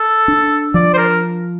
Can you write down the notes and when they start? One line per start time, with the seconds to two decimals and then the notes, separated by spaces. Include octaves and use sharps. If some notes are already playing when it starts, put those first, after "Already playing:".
Already playing: A4
0.28 D4
0.74 F3 D5
0.94 C5
0.98 A#4